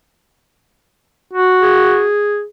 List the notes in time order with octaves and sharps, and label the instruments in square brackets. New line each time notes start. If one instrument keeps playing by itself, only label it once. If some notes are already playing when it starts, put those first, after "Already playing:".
[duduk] F#4
[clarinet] G#4